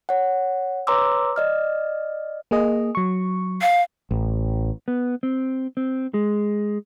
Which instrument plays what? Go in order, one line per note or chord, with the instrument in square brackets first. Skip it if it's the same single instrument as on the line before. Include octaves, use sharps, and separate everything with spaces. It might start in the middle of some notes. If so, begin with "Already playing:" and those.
[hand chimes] C#5 F#5
B4 C#5 A#5 C6 D6 E6
D5 D#5 F6
[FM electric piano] A#3 G#4 D#5
F#3 C#6
[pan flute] F5
[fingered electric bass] A1
[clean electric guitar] B3
C4
C4
G#3